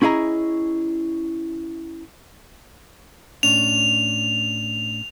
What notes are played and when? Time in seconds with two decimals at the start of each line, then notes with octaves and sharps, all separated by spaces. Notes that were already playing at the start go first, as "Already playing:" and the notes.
0.02 C#4 E4 G#4 D#5 A#5
3.43 A2 C#4 D4 F7